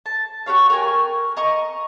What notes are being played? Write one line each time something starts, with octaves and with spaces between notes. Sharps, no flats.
A5
F#4 G4 C#5 F5
A#4 G5 G#5
D#5 A#5 C#6